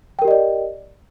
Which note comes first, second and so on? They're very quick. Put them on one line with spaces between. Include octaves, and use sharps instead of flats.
G5 A#4 G4 D#5 D5